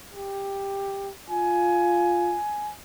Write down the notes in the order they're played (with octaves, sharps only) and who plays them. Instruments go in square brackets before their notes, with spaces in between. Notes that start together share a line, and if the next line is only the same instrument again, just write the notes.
[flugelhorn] G4
[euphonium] F4 [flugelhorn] G#5